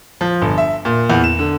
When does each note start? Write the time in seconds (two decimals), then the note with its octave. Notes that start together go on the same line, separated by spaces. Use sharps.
0.21 F3
0.42 G1
0.58 E5
0.85 A#2
1.10 E2
1.24 E7
1.39 D3